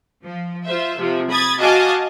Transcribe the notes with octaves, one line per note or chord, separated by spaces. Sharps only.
F3
F4 C5 E5
C3 F3
B5 D#6 G#6 A6
F#4 D#5 F5 G#5 A5 D6